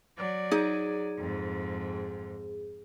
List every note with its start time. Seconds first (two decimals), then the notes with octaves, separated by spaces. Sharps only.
0.18 F#3 D5
0.51 D#4 G#4
1.17 F2 G#2